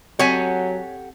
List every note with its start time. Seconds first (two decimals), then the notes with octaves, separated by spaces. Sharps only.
0.19 F#3 C4 G4 A4 C#5 F#5 G#5